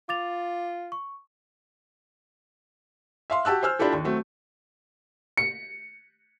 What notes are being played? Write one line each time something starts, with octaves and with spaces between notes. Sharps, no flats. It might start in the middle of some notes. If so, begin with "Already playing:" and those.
F4 D6 A6 F7
C#6
E5 F5 C6
F#4 G4 A5 E6 F#6
C5 G#5 E6 F6
D4 E4 F4 G4 A4
D#2
F#3 A3 C4
C#7